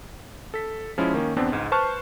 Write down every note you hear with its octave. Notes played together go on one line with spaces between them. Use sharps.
A4 B6
F3 G#3 C#4 E4
D#3 A#3 C#4
E2 B3 C4 D4
C#2 G#2
B4 C5 A5 C#6 F6 F#6